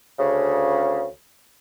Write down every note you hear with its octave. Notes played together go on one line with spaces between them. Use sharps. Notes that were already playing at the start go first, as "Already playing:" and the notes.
D2 C#3